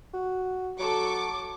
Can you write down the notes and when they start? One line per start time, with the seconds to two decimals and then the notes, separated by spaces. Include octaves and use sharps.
0.14 F#4
0.79 F#3 A4 C#6 D6